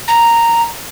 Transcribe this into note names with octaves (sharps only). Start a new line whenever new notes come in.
A#5